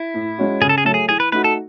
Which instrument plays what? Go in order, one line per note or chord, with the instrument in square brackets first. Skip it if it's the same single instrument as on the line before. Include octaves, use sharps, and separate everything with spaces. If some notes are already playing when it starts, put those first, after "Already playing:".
Already playing: [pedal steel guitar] E4
[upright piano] A2
G#3 C#4 F#4
[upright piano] C#3 [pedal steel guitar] G#4
[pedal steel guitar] A4
G#4
[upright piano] F#3 A3 [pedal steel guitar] A4
[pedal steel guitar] G#4
[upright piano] E3 [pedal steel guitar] G#4
[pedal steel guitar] B4
[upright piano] A3 D#4 F#4 [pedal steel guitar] B4
[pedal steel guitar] A4